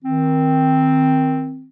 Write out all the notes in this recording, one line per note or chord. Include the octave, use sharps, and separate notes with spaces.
D#3 C4